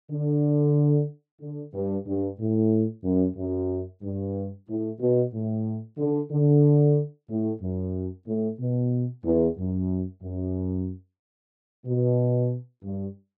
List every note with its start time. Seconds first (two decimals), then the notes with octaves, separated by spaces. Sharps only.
0.11 D3
1.41 D3
1.74 G2
2.06 G2
2.39 A2
3.04 F#2
3.36 F#2
4.02 G2
4.68 A2
5.00 B2
5.32 A2
5.97 D3
6.31 D3
7.28 A2
7.61 F#2
8.26 A2
8.59 B2
9.25 E2
9.57 F#2
10.22 F#2
11.86 B2
12.83 G2